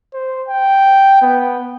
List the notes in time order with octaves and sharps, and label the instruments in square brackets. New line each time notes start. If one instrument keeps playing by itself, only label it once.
[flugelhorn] C5
G5
B3